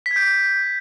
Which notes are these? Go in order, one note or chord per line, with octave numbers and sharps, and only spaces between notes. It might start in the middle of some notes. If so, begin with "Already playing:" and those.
B6
G#6
G6